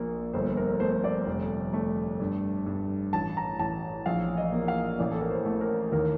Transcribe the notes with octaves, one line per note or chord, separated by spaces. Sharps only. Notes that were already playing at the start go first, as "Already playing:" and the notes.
Already playing: A#1 A#3
G1 C5
A#4
A3 C5
D5
F1
A3
G2
G2
A1 A5
A#5
A1 A5
A#1 F5
D#5
A#3
F5
A1 D5
A4
A#4
C5
A3
A#4
D#2 A#4